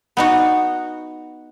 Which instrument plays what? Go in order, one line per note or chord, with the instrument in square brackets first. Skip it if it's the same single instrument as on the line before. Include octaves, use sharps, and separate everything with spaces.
[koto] B3 D#4 F#4